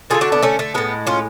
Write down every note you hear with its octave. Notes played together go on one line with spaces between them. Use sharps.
D3 F#3 A3 F4 G#4
D4 F#4
B3 D4
A3 C#4
A3
A2 G#3 B3
C#4 F4